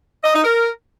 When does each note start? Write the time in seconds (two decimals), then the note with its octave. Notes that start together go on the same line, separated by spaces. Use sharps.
0.24 D#5
0.34 D#4
0.44 A#4